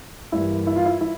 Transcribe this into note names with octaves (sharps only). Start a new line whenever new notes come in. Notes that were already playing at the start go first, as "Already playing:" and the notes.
G2 E3 G3 A#3 E4
E4
F4
E4
E4